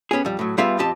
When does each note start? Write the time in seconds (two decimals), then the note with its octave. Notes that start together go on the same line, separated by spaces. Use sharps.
0.11 B3 C#4 G4 G#4
0.25 F2 G3
0.39 A2 F#3
0.58 G3 B3 F4 G#4 E5
0.79 F2 C4 G4 D#5 A5